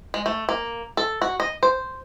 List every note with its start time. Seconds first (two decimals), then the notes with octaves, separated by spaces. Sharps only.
0.14 G#3
0.26 A3
0.49 A#3
0.97 A4
1.22 F#4
1.40 D#5
1.63 C5